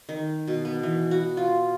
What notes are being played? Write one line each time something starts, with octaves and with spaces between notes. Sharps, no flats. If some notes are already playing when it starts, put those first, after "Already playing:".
D#3
B2
B3
E3
F#4
F4